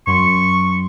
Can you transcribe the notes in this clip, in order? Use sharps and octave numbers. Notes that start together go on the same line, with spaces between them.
F#2 F#3 C6 C#6